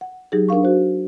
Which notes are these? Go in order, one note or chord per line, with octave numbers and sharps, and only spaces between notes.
F#5
F#3 D#4 G4 G#4
D4 A#4 F5 C#6
F#4 C5